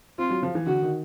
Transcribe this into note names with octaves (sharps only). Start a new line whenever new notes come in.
C4 F4
F#3
F3
E3
D3 F#4
D#3